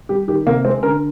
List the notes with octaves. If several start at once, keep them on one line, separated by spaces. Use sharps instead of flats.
G3 G4
D#3 G4
C3 A#3
G#3 C4
D3 A#4